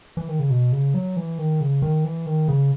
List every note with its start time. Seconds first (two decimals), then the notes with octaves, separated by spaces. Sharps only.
0.17 E3
0.28 D#3
0.39 C#3
0.50 B2
0.72 C#3
0.94 F#3
1.17 E3
1.38 D#3
1.61 C#3
1.82 D#3
2.05 E3
2.26 D#3
2.48 C#3